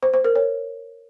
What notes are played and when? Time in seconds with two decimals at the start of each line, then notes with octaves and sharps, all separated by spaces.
0.03 C5
0.14 C5
0.24 A#4
0.35 C#5